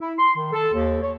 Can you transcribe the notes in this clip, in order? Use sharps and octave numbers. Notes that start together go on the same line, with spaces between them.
E4
C6
D#3
A4
D#2
C#5